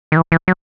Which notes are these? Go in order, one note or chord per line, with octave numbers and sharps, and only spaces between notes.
D#3
E3
E3
F#3